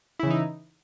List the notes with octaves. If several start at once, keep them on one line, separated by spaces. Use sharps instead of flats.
C#3 E3 D#4 E4